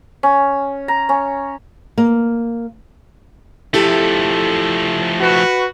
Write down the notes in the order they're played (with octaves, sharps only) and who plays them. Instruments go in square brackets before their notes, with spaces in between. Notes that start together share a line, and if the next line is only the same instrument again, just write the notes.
[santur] C#4
A#5
C#4
[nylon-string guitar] A#3
[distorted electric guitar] F3 A3 [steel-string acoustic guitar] E4 G4 A4
[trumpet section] F#4 B4